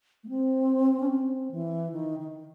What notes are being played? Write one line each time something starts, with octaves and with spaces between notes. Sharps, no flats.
A3
C4
C#4
C4
E3
D#3
D#3